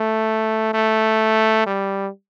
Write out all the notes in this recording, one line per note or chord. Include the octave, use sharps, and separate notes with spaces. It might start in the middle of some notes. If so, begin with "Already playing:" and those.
Already playing: A3
A3
G3